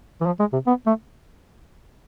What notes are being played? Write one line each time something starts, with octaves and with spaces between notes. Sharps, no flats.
E3
F3
G#3
C3
B3
A3